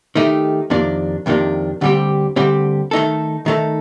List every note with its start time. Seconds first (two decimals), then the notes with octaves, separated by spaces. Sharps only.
0.15 D#3 A3 D#4 G4
0.70 F2 C3 D#3 A#3 D4
1.26 F2 C3 D#3 A#3 D4
1.81 D2 D3 G3 C4 G4
2.36 D2 D3 G3 C4 G4
2.91 D#3 A3 D#4 A4
3.46 D#3 A3 D#4 A4